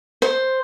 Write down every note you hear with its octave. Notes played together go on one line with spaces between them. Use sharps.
C5